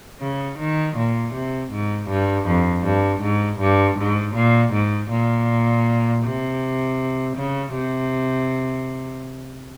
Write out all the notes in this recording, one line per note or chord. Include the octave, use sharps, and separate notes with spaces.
C#3
D#3
A#2
C3
G#2
G2
F2
G2
G#2
G2
G#2
A#2
G#2
A#2
C3
C#3
C3